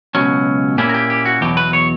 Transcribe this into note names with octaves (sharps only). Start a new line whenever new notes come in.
C#2 B2 F#3 C#4
A#2 A#3 C#4 E4 G4
A#4
G4
G4
F#4
E2 B2 F#3 G4
B4
C#5